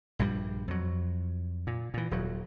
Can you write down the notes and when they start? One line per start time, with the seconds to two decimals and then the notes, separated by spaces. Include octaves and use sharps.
0.19 A#1 G2 D#3 G3
0.68 F2 F#3
1.67 A#2
1.94 A#2 E3
2.11 D#1 F#3